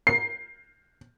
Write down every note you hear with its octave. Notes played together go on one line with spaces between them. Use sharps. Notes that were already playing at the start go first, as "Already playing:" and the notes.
C7